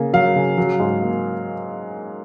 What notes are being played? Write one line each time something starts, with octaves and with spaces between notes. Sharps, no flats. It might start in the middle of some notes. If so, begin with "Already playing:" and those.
Already playing: C#3 A#3
F#3 F5
C#3
F#3
G#2
A#3